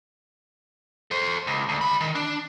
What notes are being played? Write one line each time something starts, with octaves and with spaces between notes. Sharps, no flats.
A4 C5
C#2
D2
G#3 B5
D#3
D4